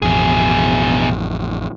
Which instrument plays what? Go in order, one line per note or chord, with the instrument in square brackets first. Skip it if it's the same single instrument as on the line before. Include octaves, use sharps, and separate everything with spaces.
[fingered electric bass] A1 F2 [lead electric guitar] B2 G#4